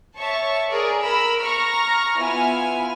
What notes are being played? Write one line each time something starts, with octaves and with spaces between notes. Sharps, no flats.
C#5 E5 A5 C#6
G#4 A#4 D5
A#4 B5 E6
A#5 C#6 F6 A#6
B3 E4 F4 G#5 F6